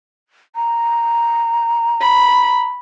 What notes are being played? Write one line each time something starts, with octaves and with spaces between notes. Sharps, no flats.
A#5
B5